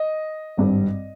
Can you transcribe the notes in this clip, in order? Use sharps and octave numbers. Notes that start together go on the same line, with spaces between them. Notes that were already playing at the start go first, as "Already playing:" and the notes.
Already playing: D#5
G#1 G2 G3 C4